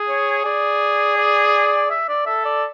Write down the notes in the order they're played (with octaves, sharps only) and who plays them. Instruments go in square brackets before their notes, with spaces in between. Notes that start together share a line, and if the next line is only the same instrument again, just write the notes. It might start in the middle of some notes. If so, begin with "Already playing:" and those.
Already playing: [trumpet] G#4
[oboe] C#5
[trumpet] G#4 [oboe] D5
[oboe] D5
E5
D5
[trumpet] A4 [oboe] E5
[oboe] D5